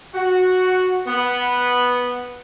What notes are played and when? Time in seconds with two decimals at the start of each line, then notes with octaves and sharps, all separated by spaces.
0.14 F#4
1.07 B3